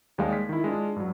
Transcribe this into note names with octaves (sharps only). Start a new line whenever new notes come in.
D#2 G3 G#3 F5
B6
D#3 E4
G#3 D4 F4
G2 F#3